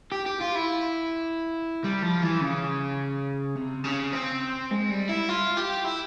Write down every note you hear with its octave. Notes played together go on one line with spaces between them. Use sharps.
G4
G4
F4
E4
G3
F3
E3
C#3
C3
C#3
C4
G#3
G3
E4
F4
G4
E4